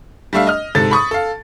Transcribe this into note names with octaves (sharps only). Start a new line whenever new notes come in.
G3 A3 D4 E5 F5
D#5 F6
G#2 C3 A4 A6
B5 C#6 D#6
A4 F5